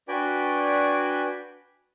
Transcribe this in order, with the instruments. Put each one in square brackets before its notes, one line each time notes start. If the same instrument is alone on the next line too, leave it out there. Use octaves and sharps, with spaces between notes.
[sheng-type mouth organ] D4 F#4 B4 D5 G5 G#5